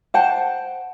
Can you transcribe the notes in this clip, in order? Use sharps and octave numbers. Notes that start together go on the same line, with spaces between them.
C5 F#5 G5 A5